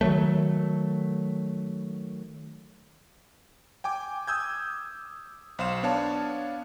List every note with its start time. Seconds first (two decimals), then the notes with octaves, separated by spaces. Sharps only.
0.01 D#3 F3 F#3 A3
3.84 G5 G#5 D6
4.27 D#6 E6 G6 G#6
5.59 B1 C5 F5 C6 E7
5.83 B3 D4 C#5 F5 A5